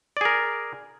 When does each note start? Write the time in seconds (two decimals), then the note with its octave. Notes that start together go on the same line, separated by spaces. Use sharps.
0.17 D5
0.21 G#4
0.25 A#4